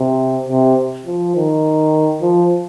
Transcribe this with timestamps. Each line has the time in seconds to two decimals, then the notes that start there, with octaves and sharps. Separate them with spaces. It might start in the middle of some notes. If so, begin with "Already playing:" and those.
Already playing: C3
0.49 C3
1.06 F3
1.36 D#3
2.22 F3